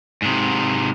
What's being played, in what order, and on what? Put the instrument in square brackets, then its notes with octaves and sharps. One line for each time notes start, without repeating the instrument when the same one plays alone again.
[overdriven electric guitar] G#2 C3